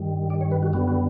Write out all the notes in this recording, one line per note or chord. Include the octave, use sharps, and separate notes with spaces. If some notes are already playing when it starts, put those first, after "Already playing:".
Already playing: G2 D#3 G3
D5
C#5
B4
F#4
F#2 D3 G3 B3 F#4
F#4